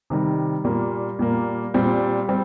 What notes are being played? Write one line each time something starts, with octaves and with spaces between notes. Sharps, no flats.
C3 D#3 G3
A#2 G3 A#3
A#2 G3 A#3
A#2 G3 C4
G3 C4